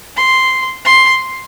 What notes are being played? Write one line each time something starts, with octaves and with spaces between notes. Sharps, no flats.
C6
C6